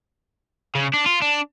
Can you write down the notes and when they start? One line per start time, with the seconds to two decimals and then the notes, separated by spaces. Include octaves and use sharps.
0.75 C#3
0.94 D4
1.06 F4
1.22 D4